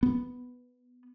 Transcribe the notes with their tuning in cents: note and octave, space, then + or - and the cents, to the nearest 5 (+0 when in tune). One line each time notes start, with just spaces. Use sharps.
B3 +5